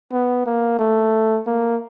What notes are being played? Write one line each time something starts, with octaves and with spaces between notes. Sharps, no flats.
B3
A#3
A3
A#3